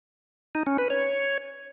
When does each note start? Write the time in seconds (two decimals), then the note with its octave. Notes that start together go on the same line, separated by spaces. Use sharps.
0.55 D#4
0.67 C#4
0.78 B4
0.90 C#5